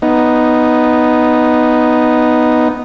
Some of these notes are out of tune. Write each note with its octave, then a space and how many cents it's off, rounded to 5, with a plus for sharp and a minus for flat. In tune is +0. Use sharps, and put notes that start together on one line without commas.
B3 +0 D#4 +0